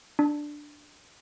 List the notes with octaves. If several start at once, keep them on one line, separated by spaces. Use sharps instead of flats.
D4